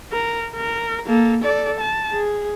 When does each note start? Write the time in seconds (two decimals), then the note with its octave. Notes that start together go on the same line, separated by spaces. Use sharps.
0.13 A#4
0.56 A#4
1.07 A#3 A4
1.43 A4 D5
1.80 A5
2.11 G#4